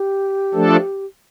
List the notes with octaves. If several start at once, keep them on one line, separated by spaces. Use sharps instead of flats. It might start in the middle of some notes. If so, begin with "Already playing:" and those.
Already playing: G4
F3 A3 D4 A4